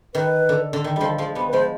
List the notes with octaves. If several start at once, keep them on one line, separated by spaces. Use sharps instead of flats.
D#3 B4
D3
D3
D#3
D3 F3 G3
F3 G#3
G3 B3
B4
F3 G#3 C5